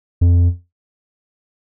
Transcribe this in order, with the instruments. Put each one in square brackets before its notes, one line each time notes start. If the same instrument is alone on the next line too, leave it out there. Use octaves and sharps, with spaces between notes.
[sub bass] F2